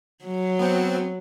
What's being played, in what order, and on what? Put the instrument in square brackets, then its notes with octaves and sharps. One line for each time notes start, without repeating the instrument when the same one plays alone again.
[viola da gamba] F#3
[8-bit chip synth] B3 C4